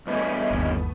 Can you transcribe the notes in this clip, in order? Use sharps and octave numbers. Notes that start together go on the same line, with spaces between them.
E2 G2 A3 B3 C#4 B4 D#5 E5
G1 D#2